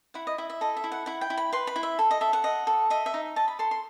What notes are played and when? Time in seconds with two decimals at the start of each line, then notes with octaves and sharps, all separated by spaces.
0.14 E4 F#5
0.27 D#5
0.38 E4 E5
0.50 E5
0.61 A4 D#5
0.77 E5
0.84 E4
0.92 F#5
1.06 E4 F#5
1.21 G5
1.30 E4
1.37 B5
1.53 B4 C6
1.67 B5
1.76 E4
1.83 E5
1.99 A4
2.11 D#5
2.21 A4 E5
2.33 F#5
2.44 D#5
2.67 A4
2.90 D#5 E5
3.06 E5
3.14 D#4
3.36 D#5 A5
3.48 B5
3.59 A4 C6
3.71 C6